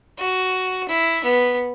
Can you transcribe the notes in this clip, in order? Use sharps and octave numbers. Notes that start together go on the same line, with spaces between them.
F#4
E4
B3